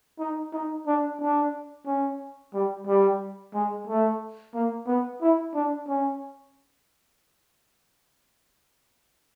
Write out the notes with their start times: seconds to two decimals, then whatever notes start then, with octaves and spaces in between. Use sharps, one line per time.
0.19 D#4
0.53 D#4
0.87 D4
1.21 D4
1.87 C#4
2.54 G3
2.87 G3
3.54 G#3
3.87 A3
4.54 A#3
4.87 B3
5.22 E4
5.54 D4
5.88 C#4